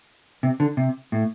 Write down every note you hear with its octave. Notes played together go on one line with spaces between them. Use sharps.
C3
D3
C3
A2